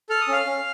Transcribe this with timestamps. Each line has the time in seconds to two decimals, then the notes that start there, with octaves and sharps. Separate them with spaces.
0.09 A4 F6
0.21 D#6
0.28 C#4 F5 F6
0.45 C#4